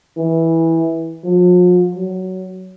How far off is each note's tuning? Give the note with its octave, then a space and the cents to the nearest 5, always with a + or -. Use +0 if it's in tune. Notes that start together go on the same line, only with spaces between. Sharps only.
E3 -10
F3 +45
F#3 +15